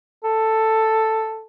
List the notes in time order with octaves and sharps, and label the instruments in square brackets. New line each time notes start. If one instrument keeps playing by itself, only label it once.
[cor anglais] A4